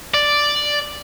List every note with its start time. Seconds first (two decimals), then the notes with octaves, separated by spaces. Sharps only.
0.14 D5